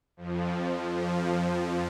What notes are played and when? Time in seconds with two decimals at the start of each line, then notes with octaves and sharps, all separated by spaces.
0.17 F2 F3
0.97 F2 F3